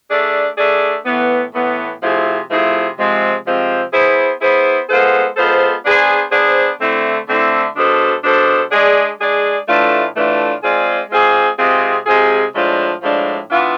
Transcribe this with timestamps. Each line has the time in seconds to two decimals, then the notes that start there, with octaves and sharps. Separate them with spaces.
0.10 A3 D4 G#4 D5
0.58 A3 D4 G#4 D5
1.05 A2 E3 B3
1.53 A2 E3 B3
2.02 C3 F3 A3 E4 G#4
2.50 C3 F3 A3 E4 G#4
2.97 C3 F3 G#3 C4
3.45 C3 F3 G#3 C4
3.93 B3 E4 G#4 C5
4.41 B3 E4 G#4 C5
4.89 G#3 B3 F4 A4 C5
5.36 G#3 B3 F4 A4 C5
5.84 B3 D4 G#4 C5
6.32 B3 D4 G#4 C5
6.80 D3 A3 C4 E4
7.28 D3 A3 C4 E4
7.76 B2 G#3 D4 A4 C5
8.23 B2 G#3 D4 A4 C5
8.71 G#3 D4 G#4 D5
9.20 G#3 D4 G#4 D5
9.68 A2 E3 A3 D4 F4
10.15 A2 E3 A3 D4 F4
10.63 G#3 C4 F4 G#4 D5
11.10 G#3 C4 F4 G#4 D5
11.58 C3 G#3 C4 F4 G#4
12.06 C3 G#3 C4 F4 G#4
12.54 A2 F3 G#3 D4 F4
13.03 A2 F3 G#3 D4 F4
13.49 E3 B3 D4 F4